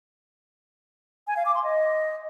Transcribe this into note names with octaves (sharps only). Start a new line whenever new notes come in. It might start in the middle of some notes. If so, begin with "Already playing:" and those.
G#5
F5
D6
C6
D#5